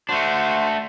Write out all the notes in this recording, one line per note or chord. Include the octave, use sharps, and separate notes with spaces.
A3 D4 F#4 C5